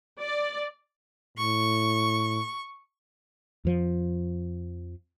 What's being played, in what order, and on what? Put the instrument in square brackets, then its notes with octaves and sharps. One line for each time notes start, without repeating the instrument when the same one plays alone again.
[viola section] D5
[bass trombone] A2 [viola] C#6
[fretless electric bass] F2 F3